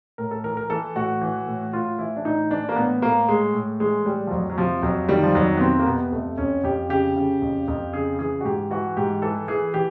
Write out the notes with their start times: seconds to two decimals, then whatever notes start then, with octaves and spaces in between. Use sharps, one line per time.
0.18 A2 A#4
0.31 A4
0.44 E3 A#4
0.57 A#4
0.70 E3 A4
0.95 A2 F#4
1.21 E3
1.47 A2
1.73 A2 F4
1.99 E3 E4
2.16 D4
2.24 A2 D#4
2.51 E3 D4
2.69 A#3
2.76 A2 B3
3.02 A2 A#3
3.29 A2 G#3
3.53 A2
3.80 E3 G#3
4.06 A2 G3
4.27 F3
4.31 F2 F#3
4.50 F#3
4.57 C3 F3
4.83 F2 F#3
5.09 D#3 G3
5.23 F3
5.35 F2 F#3
5.57 B3
5.61 C3 C4
5.79 A#3
5.86 C3 B3
6.12 F2 A3
6.38 F2 C#4
6.63 F2 G4
6.89 C#3 G4
7.16 C#3
7.42 F2
7.68 F2
7.93 C#3 G#4
8.19 E3 G#4
8.41 F#4
8.44 G#2 G4
8.71 E3 F#4
8.97 G#2 G4
9.22 E3 A4
9.48 E3 G#4
9.74 E3 G4